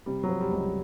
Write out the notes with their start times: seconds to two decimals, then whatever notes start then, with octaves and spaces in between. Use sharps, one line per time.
0.06 C3 G3
0.24 F#3
0.29 F3
0.41 G3
0.52 C#2
0.57 G3